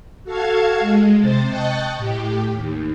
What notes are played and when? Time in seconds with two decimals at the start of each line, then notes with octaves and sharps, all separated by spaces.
0.24 F#4 A4 F5 A5 G#6
0.80 G#3
1.19 C3 C5 A6
1.48 D#5 G5 A5 C#6 F#6 A6
1.97 A2 G4
2.53 D#2